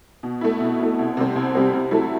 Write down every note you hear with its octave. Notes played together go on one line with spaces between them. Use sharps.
B2
A3 E4
B2
A3 E4
C2
C3 G3 C4
C2
C3 G3 C4
C3
F#3 A3 E4 A4